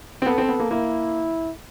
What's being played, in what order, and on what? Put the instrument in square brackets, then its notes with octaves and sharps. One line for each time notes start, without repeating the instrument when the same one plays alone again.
[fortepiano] C4
[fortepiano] B3 [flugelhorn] A4
[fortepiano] C4
B3
A#3
[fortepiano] A#3 [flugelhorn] E4